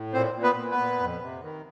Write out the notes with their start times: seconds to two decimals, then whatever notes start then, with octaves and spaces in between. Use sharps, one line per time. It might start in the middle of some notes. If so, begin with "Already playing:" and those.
Already playing: A2
0.13 A#2 C4 C5
0.35 A#2
0.43 B3 B4
0.56 A#2
0.71 B3 B4
0.78 A#2
0.99 F2
1.21 C3
1.42 D#3